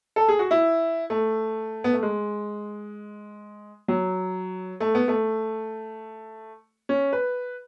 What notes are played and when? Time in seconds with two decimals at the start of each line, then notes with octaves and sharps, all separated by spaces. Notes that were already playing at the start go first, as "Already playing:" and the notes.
0.16 A4
0.29 G#4
0.39 F#4
0.51 E4
1.10 A3
1.84 B3
1.93 A3
2.02 G#3
3.88 F#3
4.80 A3
4.95 B3
5.08 A3
6.89 C#4
7.13 B4